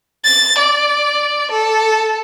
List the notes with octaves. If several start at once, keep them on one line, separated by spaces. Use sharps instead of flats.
A6
D5
A4